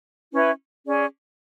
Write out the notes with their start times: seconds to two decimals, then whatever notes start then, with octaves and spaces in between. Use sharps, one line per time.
0.32 C#4 E4 B4 E5
0.85 C#4 G#4 D5 G#5